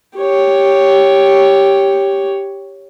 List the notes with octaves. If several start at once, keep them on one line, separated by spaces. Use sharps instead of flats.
G4 C#5